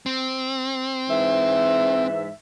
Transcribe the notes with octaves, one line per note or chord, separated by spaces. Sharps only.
C4
G#2 E3 E5